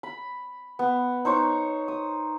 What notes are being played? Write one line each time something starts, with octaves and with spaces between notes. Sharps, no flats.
B5
B3
D#4 C5 C#5 A#5
D#6